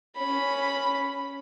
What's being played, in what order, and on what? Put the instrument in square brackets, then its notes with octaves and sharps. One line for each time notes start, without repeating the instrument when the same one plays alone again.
[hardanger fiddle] C#4 B5